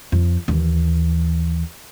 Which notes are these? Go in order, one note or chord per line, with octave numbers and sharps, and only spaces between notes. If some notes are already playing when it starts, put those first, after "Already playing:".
F2
D#2 E3